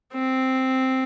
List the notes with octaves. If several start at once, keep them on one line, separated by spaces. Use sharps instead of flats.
C4